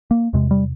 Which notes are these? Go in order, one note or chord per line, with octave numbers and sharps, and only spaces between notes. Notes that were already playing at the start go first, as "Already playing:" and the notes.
A#3
E2 C3 G#3
G3